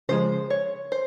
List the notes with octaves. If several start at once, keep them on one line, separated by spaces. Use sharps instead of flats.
C#3 F3 G#3 C5
C#5
C5